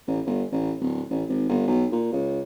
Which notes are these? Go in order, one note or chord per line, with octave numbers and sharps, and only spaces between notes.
A1
G1
A1
D1
A1
G#1
G1
B1
A#2
C#2